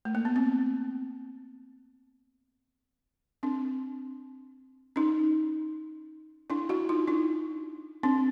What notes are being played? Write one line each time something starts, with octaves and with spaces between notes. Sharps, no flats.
A3
A#3
B3
C4
C4 D4
C#4 D#4
D4 E4
E4 F#4
D#4 F4
D4 E4
C4 D4